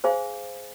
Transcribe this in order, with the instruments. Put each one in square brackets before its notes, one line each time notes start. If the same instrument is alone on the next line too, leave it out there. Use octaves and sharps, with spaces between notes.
[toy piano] G#4 C5 F5 G#5